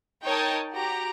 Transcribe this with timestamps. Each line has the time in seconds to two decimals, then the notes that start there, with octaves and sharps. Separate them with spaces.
0.24 D#4 A#4 C#5 G5 A5 D#6
0.73 F#4 G4 A#5